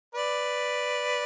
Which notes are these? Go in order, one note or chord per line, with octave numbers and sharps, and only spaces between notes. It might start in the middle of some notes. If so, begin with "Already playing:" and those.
B4 D5